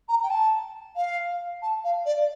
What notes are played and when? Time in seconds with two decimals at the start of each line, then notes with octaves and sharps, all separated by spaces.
0.08 A#5
0.23 G5
0.30 A5
0.96 F5
1.62 A5
1.84 F5
2.06 D5